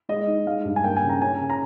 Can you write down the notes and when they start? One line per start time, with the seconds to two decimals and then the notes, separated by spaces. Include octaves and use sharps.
0.09 G#3 D#5
0.27 D#4
0.47 G#3 F5
0.65 G2
0.76 G#5
0.84 A#3 G5
0.96 G#5
1.03 C#3
1.09 A#5
1.22 C#4 G#5
1.40 C#3
1.50 A#5